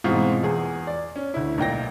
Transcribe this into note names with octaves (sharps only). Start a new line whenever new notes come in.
G#2 B2 E3 C4 F4
E2 G#4
D5
C#4
D2 E4
B1 A#2 G5 A#6